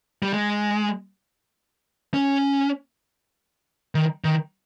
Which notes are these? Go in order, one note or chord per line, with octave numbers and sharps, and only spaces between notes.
G3
G#3
C#4
D#3
D#3